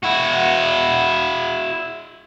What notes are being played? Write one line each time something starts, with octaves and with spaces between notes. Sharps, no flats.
E4 F#4